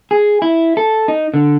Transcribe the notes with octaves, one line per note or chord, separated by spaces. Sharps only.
G#4
E4
A4
D#4
D3